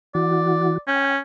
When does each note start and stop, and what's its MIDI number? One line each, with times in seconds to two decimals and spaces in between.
0.15 0.78 52
0.15 0.78 66
0.15 0.78 74
0.87 1.19 61
0.87 1.16 79